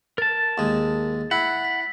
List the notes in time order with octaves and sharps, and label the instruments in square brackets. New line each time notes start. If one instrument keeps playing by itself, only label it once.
[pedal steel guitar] A#4 A5 [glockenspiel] A6
[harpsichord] D#2 G#3
[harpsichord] E4 [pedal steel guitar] F#5 [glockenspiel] B6
[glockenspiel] B6